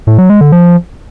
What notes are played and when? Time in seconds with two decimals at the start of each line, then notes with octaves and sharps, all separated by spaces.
0.07 A2
0.18 F#3
0.30 G#3
0.41 D3
0.52 F3